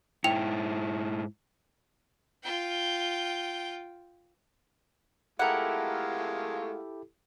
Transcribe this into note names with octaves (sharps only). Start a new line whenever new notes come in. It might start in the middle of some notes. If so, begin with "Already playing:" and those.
G#2 E4 G5 F7
F4 G5
G#3 A3 E4 F4 G4 A4 A#4 F#5